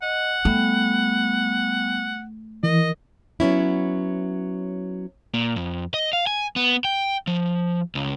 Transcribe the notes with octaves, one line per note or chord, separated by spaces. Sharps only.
D#5 F#5
G3 A3 B3 G5
E3 A#4 D#5
F#3 B3 C#4 E4
A#2
F2
D#5
F5
G#5
B3
G5
F3
C#2